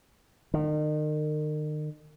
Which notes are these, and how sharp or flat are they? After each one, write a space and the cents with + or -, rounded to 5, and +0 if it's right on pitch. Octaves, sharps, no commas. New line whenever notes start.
D#3 -35